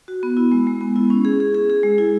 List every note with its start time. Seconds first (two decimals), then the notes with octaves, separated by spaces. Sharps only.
0.08 F#4
0.23 B3
0.37 E4
0.52 G#3
0.67 G#3
0.81 B3
0.96 E4
1.10 C#4
1.25 G#4
1.40 G#4
1.54 G#4
1.70 G#4
1.83 G#3
1.98 E4